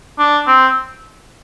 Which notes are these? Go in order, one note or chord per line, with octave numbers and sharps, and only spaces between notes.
D4
C4